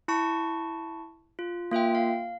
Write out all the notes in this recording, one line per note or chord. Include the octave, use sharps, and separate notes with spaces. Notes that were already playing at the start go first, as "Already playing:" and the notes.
E4 A5 C#6
F4
A#3 F4 E5 G5
F5